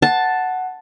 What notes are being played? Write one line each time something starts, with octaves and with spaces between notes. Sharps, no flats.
F#5 A5